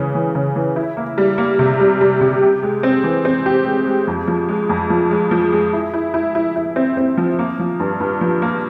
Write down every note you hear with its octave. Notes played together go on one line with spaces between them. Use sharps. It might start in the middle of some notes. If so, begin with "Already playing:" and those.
Already playing: C#3 E3 G#3
E3
C#3
E3
E4
A#3
G3
A#3
C3
G3
G3
C3
G4
G#3
C4
E3
C4
G4
G#3
G#3
F2
F3
G#3
F2
F3
G#3
F3
G#3
E4
E4
E4
E4
E4
C4
C4
F3
A#3
F3
G2
G2
F3
A#3